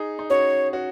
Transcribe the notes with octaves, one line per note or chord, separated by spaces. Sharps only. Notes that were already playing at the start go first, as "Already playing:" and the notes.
Already playing: D#4 G#4
D#4
C#4 F#4 C#5
C#4 F#4